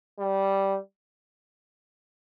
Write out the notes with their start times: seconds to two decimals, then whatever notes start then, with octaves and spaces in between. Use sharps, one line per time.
0.19 G3